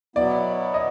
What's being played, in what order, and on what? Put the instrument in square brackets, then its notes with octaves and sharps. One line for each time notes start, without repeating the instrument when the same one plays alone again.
[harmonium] B2 F#3 B3 E4 [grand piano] D5
[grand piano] D#5